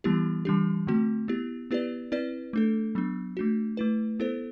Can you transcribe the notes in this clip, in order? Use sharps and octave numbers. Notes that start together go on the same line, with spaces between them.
E3 G3 B3 E4 G4
E3 G3 D4 G4
D3 A3 C4 F#4
B3 E4 G4
B3 E4 G4 B4 D5
C4 E4 B4 D5
A3 D4 A4
F#3 B3 D4
A3 D4 F#4
A3 E4 B4
B3 E4 A4 C5